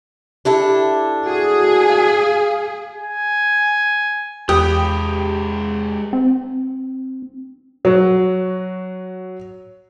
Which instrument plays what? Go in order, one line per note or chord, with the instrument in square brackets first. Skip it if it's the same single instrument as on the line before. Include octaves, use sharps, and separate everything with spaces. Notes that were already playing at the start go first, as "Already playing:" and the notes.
[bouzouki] D4 E4 A4 [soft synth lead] G4
[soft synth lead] F#4 [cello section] G#4
[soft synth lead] F5
[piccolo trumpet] G#5
[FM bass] E2 [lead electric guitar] G#3 B4 [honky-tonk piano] G4 [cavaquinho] D#6
[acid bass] C4
[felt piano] F#3 F#4